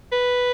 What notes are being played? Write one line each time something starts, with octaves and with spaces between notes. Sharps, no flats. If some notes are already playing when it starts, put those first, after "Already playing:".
B4